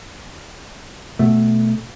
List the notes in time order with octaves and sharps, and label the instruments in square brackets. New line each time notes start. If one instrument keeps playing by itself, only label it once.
[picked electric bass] B2 A3